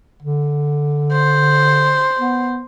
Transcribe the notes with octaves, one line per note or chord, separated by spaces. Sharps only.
D3
C5
B3